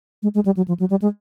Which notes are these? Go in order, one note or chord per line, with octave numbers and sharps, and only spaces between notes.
G#3
G#3
G3
F#3
F3
F#3
G3
G#3